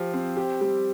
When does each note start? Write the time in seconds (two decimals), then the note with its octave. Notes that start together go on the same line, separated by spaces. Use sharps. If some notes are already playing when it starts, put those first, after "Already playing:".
Already playing: F3 G4
0.13 C4
0.37 G4
0.61 G3